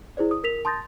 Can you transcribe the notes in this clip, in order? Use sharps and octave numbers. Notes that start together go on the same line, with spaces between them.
E4 G#4 C5 D5
D#6
A#4 B6 F7
A5 C6 D#6 G6 A6 A#6